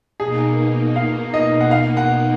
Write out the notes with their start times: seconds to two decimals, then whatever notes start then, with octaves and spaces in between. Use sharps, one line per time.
0.20 B2 A#3 D#4 G#4
0.96 F5
1.34 D#5
1.61 F#5
1.71 F5
1.97 F#5